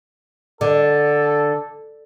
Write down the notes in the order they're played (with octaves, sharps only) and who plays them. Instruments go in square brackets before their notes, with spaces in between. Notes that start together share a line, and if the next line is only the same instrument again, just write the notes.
[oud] D3 [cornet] A4